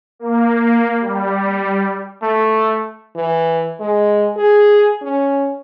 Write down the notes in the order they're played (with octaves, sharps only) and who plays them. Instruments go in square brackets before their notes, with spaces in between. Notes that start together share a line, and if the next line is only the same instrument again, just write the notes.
[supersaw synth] A#3
G3
[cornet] A3
[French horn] E3
G#3
G#4
C#4